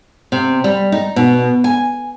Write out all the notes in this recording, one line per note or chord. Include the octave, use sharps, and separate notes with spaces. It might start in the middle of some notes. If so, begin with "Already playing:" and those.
C3
G3
D#4
B2
G#5